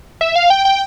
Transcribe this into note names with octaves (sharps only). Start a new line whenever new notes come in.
E5
F5
G5
G5